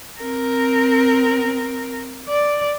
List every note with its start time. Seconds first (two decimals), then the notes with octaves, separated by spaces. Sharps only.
0.20 C4 A#4
2.29 D5